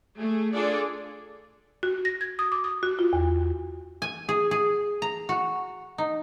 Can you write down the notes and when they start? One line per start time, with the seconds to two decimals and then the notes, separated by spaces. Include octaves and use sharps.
0.16 A3 G#4
0.54 D4 F4 G#4 A4 D5
1.83 F#4
2.05 A#6
2.21 G#6
2.39 D#6
2.52 D6
2.64 D#6
2.83 F#4
2.99 F4
3.13 E2
4.02 G#5
4.29 G#4
4.51 G#4
5.02 A#5
5.29 F#4
5.98 D#4